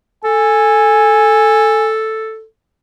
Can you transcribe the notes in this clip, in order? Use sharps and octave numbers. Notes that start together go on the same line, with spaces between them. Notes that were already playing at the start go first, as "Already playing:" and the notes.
A4 G#5